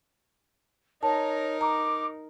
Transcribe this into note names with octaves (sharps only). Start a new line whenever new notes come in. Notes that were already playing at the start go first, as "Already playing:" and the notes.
D#4 A#4 C#5 A5
A#5 D6